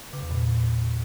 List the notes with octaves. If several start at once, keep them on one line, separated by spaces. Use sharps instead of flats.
C#3
E2
A#2